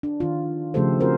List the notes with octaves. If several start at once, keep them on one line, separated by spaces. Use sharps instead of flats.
D4
D#3 F4
C#3 F3 A3 G4 A4 C5
C4 F4 F#4 G#4 A#4 C5